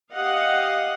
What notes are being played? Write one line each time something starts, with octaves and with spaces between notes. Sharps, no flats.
G4 D#5 F5 F#5